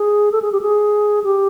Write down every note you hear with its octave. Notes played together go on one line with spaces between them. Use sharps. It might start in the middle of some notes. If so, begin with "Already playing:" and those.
Already playing: G#4
A4
G#4
G4
G#4
G4